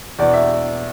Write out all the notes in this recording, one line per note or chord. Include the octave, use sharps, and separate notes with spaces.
E2 B2 D5
E5